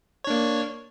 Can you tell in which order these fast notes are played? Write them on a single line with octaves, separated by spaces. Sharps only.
C#5 D4 A#3